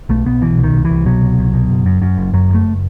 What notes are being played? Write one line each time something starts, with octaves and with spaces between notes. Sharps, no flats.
B1 A3
B1 B3
B2 E3
C2
D#3
C2
E3
C2
B2 F#3
C2
C2
B2
F#1
F#2
F#2
F#1
F#2 F#3
F#1 A3